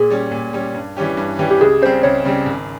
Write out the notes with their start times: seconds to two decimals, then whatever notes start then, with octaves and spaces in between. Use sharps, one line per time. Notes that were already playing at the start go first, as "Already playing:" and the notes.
Already playing: A#2 G#4
0.10 G3 C#4
0.32 A#2
0.53 G3 C#4
0.74 G2
0.97 E3 G3 C#4 G4
1.17 G2
1.39 E3 G3 C#4 G4
1.51 G4
1.61 C#2 G#4
1.81 C#3 G3 C4 C5
2.03 C#2 C#5
2.25 C#3 G3 C4
2.46 G#1